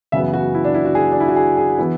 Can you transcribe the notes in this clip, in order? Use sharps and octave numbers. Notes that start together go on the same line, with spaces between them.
F#2 C#3 E3 B3 E5
F#4
E4
D4
E4
F#4
G#4
D4
E4
F#4
G#4
G#4
E3 B3 E4